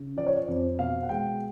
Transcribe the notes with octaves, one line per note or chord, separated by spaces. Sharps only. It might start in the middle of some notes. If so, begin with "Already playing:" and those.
Already playing: C#3
F3 D5
C#5
D5
F2
B2 F5
F#5
G#3 G5